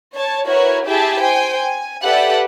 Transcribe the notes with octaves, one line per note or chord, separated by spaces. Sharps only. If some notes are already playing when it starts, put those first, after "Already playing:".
C#5 A5
E4 F#4 A#4 B4 C#5
E4 G4 G#4 E5 A5
C5 G5 G#5
G#5
G4 A4 B4 D5 E5 F#5